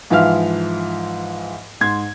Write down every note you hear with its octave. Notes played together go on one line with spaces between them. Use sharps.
G#2 E3 F3 E5 F5 F6
G#2 C6 G#6